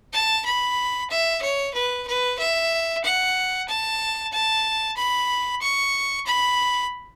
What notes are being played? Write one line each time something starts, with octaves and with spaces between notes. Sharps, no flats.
A5
B5
E5
C#5
B4
B4
E5
F#5
A5
A5
B5
C#6
B5